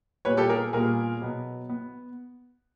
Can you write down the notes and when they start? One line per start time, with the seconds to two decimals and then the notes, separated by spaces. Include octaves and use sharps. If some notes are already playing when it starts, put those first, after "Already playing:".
0.25 A#2 G3 B3 B4 C#5
0.37 G4 A4
0.49 G#4 A#4
0.73 A#2 G3 B3 G#4 A#4
1.22 B2 F#3 B3
1.69 B3